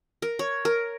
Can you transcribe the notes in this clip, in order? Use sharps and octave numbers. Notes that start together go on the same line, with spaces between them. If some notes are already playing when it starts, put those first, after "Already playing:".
A#4
C#5
A#4